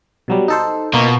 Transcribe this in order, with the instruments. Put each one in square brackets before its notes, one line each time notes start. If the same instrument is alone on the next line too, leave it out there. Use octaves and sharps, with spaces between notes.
[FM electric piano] B2 F#3 G3
D#4 A4 C5
[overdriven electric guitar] B2 [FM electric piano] A#3 B3 F4